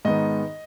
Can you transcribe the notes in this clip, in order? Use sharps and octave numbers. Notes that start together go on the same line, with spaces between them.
G#2 D#3 B3 D#5